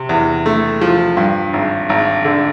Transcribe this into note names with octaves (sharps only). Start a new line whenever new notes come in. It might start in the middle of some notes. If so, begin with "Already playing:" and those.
Already playing: C3
E2
A3
F3
G2
G#1
G#1
D3